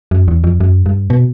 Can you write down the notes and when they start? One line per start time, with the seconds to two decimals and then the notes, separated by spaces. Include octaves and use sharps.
0.11 F#2
0.28 E2
0.44 F2
0.60 F#2
0.86 G2
1.10 B2